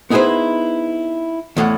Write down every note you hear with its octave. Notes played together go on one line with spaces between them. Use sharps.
B3 D#4 E4 G#4 B4 C5
E2 A2 F5 F#5